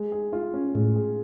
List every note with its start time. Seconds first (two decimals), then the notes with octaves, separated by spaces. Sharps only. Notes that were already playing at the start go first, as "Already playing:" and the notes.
Already playing: G#3
0.12 G#4
0.33 F4
0.54 C#4
0.74 A2 G#3
0.96 G#4